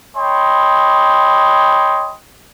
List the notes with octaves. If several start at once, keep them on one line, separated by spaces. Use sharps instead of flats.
C#5 D#5 G5 B5 C6